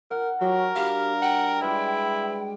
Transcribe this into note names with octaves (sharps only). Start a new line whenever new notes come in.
A#4 F#5
F#3 F#4 G4 A#4
G3 D4 G4 F5
F#5 G5
G3 G#3 E4 B4